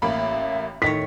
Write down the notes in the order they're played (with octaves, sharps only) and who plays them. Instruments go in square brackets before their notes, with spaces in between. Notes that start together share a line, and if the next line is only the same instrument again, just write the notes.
[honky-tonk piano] A1 A#3 B5 [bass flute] E5
[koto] A2 D#3 C#5 [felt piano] B6